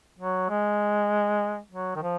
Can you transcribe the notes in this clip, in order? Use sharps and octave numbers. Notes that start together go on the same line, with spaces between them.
F#3
G#3
F#3
D#3
F3